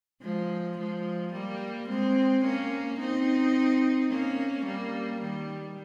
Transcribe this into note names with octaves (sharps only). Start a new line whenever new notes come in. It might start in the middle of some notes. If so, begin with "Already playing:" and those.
F3 G#3
F3 G#3
G3 A#3
G#3 C4
A#3 C#4
C4 D#4
A#3 C#4
G3 A#3
D#3 G3